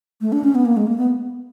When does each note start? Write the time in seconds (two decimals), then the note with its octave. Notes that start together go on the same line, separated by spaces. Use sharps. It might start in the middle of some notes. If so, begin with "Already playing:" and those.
0.21 A3
0.32 D4
0.44 C#4
0.55 B3
0.65 A#3
0.77 G#3
0.87 A#3
0.98 B3